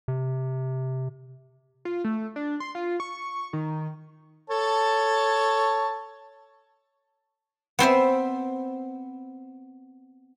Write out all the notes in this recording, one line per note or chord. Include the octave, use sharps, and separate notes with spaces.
C3
F4
A3
D4
C6
F4
C#6
D#3
A4 C#5 A5
B3 C4 C5 E5